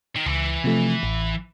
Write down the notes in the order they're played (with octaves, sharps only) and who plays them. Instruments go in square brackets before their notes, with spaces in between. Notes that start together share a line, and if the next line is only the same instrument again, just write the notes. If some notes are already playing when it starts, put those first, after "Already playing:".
[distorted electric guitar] D#3
[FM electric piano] C#2 [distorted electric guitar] E3
[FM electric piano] C3 F3 A3
A1